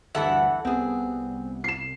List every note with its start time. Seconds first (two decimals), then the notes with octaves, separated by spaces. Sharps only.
0.15 D2 G2 E3 A4 E5 F#5
0.65 C2 B3 C4 G#4
1.64 C7 E7